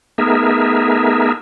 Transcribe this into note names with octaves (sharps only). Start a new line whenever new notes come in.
A3 B3 D#4 G#4 A#4 E5